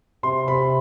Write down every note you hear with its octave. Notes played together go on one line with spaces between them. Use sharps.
C3 C6
C3 B5